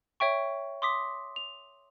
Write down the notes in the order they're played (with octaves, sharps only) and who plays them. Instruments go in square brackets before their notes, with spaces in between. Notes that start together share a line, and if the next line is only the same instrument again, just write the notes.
[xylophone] C#5 E5 G5 C#6
C6 D6 D#6 B6
F7